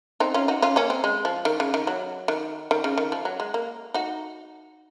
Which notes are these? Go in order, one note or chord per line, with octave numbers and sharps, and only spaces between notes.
C4 D#4
C#4 F4
D#4 F#4
C#4 F4
A#3 C#4
C4
G#3
F3
D#3
C#3
D#3
F#3
D#3
D#3
C#3
D#3
F3
F#3
G#3
A#3
D#4 F#4